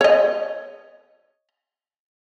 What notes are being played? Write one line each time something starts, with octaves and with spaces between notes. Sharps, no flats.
C#5 D#5